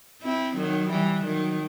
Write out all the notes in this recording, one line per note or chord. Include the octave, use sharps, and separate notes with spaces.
C4 E4
D#3 F#3
E3 G3
D#3 F#3